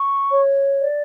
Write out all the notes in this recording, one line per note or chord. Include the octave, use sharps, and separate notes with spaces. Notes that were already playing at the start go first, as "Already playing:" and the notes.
Already playing: C#6
C#5
D5